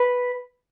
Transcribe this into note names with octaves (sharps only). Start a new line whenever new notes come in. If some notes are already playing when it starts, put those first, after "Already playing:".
Already playing: B4